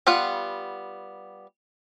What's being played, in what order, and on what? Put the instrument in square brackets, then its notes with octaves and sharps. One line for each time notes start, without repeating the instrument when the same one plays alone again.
[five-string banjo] G3 B3 F4 F#5